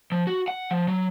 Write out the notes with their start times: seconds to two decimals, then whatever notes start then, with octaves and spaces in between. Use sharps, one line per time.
0.12 F3
0.27 F#4
0.48 F#5
0.71 F3
0.88 F#3